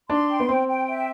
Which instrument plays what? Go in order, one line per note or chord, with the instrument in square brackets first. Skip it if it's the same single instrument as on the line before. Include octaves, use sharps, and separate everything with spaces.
[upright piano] D4 [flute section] C6
[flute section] G5
[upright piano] B3
[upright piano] C4 [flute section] G5
[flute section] G5
E5